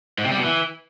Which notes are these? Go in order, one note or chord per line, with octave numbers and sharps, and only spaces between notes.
G#2
C3
G3
B2
E3